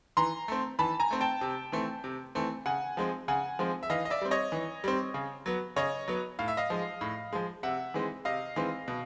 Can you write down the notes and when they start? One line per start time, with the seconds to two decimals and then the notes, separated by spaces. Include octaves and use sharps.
0.17 E3 A#5 C6
0.48 A3 C4
0.79 E3 A5 B5
1.00 G#5 A#5
1.11 A3 C4
1.21 G5 A5
1.41 C3
1.72 E3 A3 C4
2.04 C3
2.35 E3 A3 C4
2.66 C#3 F#5 G#5
2.97 F3 G#3 C4
3.28 C#3 F#5 G#5
3.59 F3 G#3 C4
3.83 E5
3.90 E3 D#5 F5
4.05 D#5
4.10 D5 E5
4.21 G3 C4
4.31 C#5 D#5
4.52 E3
4.84 G3 C4
5.14 C#3
5.46 F#3 B3
5.76 C#3 C#5 D#5
6.08 F#3 B3
6.39 A2 F5
6.48 E5
6.57 D#5 F5
6.70 F3 G#3
7.01 A2
7.33 F3 G#3
7.63 C3 E5 F#5
7.94 E3 G#3 C4
8.25 C3 D#5 F5
8.56 E3 G#3 C4
8.88 B2